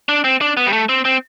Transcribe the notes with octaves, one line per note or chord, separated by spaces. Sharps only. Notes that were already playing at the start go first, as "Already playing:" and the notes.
D4
C4
D4
B3
G3
A3
C4
C4